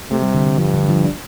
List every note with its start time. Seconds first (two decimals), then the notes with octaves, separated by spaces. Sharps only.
0.11 C3 A3
0.22 G3
0.35 D3
0.47 D3
0.58 G2 F3
0.74 D3
0.89 F3
1.04 D4